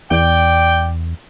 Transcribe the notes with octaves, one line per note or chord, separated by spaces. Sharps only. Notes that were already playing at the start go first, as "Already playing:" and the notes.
E2 D5 G5